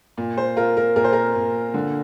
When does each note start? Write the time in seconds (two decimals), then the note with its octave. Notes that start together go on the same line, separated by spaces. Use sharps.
0.18 A#2
0.37 C5
0.56 F4 A#4
0.77 A#4
0.96 A#2 A#4
1.04 C5
1.13 A#4
1.35 A#2
1.74 D3